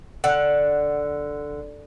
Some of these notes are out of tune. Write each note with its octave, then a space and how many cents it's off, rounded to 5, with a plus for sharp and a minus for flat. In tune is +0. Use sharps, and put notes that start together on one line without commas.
D3 +0 F#5 +0